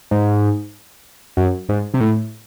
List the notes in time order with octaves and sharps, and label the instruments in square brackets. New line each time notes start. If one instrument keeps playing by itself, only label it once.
[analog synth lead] G#2
F#2
G#2
C3
A2